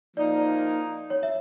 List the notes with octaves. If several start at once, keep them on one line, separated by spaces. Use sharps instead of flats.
F3 A#3 D#4 D5
C#5
E5